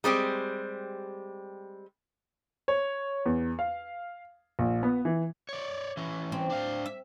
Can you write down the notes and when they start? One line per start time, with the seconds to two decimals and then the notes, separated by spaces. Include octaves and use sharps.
0.04 G3 G#3 C4 G4
2.68 C#5
3.26 E2
3.59 F5
4.59 A#1
4.83 B3
5.05 E3
5.49 C#5 D5
5.97 E3 C#4
6.32 C4
6.50 D4 F5
6.86 E5